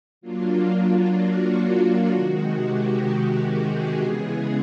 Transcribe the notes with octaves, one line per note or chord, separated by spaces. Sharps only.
F#3 A#3 D4 F4
F#4
C3 D#3 G#3
G4
G#4
C#3 E3 G#3 B3 G#4